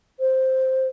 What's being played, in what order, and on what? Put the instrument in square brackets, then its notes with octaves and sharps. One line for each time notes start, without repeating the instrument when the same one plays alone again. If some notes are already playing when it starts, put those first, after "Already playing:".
[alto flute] C5